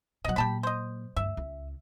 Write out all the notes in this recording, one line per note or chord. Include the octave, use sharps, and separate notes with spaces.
B2 F#3 D#5 F#5
A#2 F#3 G4 A5 B5
C5 D#5
D2 G2 E5
C#2